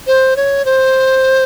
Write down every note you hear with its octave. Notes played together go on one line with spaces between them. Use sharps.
C5
C#5
C5